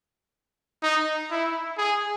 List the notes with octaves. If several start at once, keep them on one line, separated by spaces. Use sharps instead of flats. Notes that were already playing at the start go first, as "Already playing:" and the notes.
D#4
E4
G#4